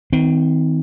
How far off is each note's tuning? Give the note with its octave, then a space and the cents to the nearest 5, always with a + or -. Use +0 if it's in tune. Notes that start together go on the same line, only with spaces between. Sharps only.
D#3 +30 C4 -30